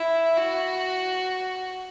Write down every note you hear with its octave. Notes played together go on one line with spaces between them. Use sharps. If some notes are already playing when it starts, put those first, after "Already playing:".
Already playing: E4
F#4